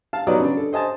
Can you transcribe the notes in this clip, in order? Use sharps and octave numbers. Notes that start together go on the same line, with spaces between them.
F5 A5
F#3 B3 D#4 B4 D5 D#5
C#3 D4
A4
C5 D#5 G#5 A5